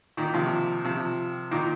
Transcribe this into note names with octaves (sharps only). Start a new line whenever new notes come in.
A#2 D#3
C3 F3
C3 F3
A#2 D#3